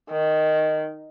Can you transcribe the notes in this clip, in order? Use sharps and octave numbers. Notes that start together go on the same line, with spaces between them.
D#3